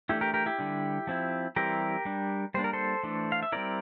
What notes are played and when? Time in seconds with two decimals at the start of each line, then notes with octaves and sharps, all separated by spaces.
0.09 E3 A3 D4 E4 G4
0.21 G4 A#4
0.34 G4 A#4
0.46 E4 G4
0.59 D3 G3 D4
1.07 F3 C4 E4
1.56 E3 G3 C4 E4 G4 A#4
2.05 G3 D4
2.54 G3 A#3 D4 C5
2.64 A#4
2.73 A4 C5
3.03 E3 A3 D4
3.32 F5
3.43 E5
3.52 G3 C4 E4 A#4 D5